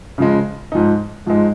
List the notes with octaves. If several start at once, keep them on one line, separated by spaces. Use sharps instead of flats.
C#3 F3 G#3
G#2 F3 G#3 D#4
G#2 F3 G#3 D#4